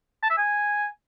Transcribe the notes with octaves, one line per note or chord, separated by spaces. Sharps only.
A5
E5
G#5